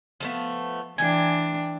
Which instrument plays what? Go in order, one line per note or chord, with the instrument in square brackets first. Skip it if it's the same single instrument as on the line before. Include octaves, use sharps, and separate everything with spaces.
[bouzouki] F3 A3 B3
[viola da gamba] E3 D4 [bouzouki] G5 G#5